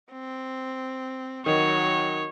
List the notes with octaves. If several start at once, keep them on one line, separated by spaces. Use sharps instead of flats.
C4
D#3 F#3 C#5